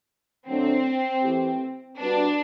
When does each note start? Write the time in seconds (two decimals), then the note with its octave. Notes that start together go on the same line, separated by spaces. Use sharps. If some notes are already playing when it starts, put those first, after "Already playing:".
0.47 D3 F#3 A3 C4 D4
1.23 E3 A3 E4 G4
2.00 G3 B3 D4 F#4 B4